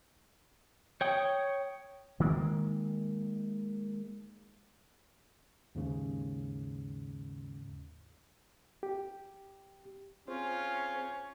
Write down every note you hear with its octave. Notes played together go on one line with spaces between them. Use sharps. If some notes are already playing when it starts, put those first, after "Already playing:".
C#5 G5 D#6
D#3 G#3 A#3
D#2 G#2 C#3
G4
C4 C#4 F4 G#4 C5